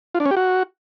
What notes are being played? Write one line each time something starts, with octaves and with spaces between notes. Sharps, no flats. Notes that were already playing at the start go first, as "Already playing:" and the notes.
F4
D4
C#4
G4
F#4